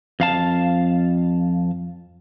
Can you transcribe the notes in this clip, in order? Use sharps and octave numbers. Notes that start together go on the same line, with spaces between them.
F2 F5 A5